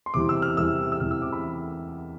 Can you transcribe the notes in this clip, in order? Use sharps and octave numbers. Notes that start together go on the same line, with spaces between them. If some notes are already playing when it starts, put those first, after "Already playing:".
C6
E2 C3 E3 G3 D6
E6
F6
E2 C3 E3 G3 E6
E6
E2 C3 E3 G3 F6
E6
D6
B5